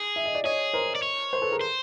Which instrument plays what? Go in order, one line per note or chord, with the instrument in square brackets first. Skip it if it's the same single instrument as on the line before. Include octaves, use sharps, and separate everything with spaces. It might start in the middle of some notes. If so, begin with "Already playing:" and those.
Already playing: [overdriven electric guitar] G#4
[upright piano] E5
D#5
D5
[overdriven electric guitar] G#4 [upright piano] C#5 D#5
[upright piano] A#4 C5
[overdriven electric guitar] D5
C#5
[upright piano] A#4 C5
A4 B4
G#4 A#4
[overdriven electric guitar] C5